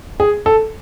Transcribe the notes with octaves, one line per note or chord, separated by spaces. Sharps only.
G#4
A4